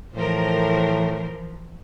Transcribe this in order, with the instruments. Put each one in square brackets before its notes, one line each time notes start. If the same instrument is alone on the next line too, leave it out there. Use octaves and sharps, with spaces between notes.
[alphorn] A2 [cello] E3 F3 [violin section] A#4 C5